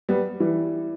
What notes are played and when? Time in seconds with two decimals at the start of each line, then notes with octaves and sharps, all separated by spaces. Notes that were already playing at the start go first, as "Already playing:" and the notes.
0.09 G3 B3
0.40 E3 G3